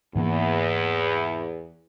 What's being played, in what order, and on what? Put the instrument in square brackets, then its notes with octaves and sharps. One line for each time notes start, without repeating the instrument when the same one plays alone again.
[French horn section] E2 [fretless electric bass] G#2 E3 A#3